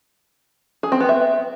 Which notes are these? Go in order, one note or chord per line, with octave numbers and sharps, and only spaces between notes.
G#4
C4
B3
E5